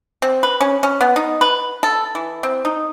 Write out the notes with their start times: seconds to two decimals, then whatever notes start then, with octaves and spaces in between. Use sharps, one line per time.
0.22 C4
0.43 B4
0.61 C#4
0.83 C#4
1.01 B3
1.16 D#4
1.41 B4
1.83 A4
2.15 E3
2.43 C4
2.65 D#4